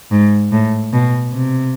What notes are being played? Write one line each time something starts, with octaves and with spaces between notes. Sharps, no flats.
G#2
A2
B2
C3